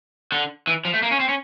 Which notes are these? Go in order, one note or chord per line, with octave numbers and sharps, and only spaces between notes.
D3
E3
F3
A3
A#3
C#4
C4
C#4